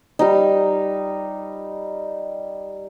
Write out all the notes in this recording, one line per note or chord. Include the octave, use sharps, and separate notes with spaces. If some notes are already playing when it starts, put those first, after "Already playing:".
G3 D#4